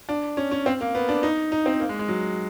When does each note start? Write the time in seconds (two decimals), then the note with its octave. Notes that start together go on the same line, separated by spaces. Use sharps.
0.09 D4
0.37 C#4
0.52 C#4
0.66 C4
0.81 A#3
0.95 B3
1.09 D4
1.23 D#4
1.52 D#4
1.66 C4
1.80 A#3
1.89 G#3
1.99 G#3
2.08 F#3